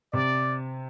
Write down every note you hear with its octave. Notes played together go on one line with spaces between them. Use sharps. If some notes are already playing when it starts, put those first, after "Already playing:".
C3 D5